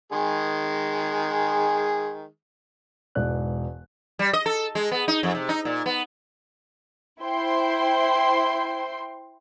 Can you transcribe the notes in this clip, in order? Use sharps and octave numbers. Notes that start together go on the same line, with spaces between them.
D#3 G#3 G#4
E1 E2 G#2 D5 F#6
G3
D#5
A4
G#3
B3
D#4
F2
C3
D#4
A#2
B3
E4 C5 G5 C6